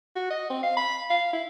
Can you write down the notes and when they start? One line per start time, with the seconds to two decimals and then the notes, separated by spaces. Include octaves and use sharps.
0.15 F#4
0.30 D#5
0.50 C4
0.63 F5
0.77 B5
1.10 F5
1.33 E4